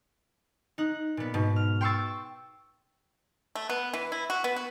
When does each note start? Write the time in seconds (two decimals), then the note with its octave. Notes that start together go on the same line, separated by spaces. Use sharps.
0.78 D#4 F#6
1.17 A#2 B3
1.34 G#2 B2
1.56 F6
1.81 G5 C6 C#6 E6 A6
3.55 A3
3.70 B3
3.94 E3
4.12 E4
4.30 F#4
4.44 B3
4.56 F#4